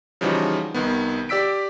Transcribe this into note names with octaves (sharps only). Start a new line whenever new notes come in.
C#3 E3 F3 G3 D#4 F#4
C2 D#3 B3
G4 D5 E6 B6 D7